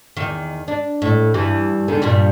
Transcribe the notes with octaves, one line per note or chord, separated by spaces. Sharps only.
E2 D#3
D4
A2
G2 E3 G3
E2 D3 D#3
G2 A#2 G3